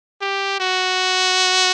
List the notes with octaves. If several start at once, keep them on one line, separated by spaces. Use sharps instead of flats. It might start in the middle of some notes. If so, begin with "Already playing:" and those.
G4
F#4